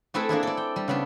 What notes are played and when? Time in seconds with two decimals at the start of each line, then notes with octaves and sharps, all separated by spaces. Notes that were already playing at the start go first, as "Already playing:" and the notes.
0.14 A3 C4 E4 G#4 A4 B4
0.29 A#3 D4 E4 G#4
0.43 A4 D5
0.57 G5
0.76 G3
0.88 C#3 B3 D4